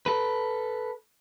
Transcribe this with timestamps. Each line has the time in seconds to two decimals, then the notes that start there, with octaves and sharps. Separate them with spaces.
0.06 A4 B4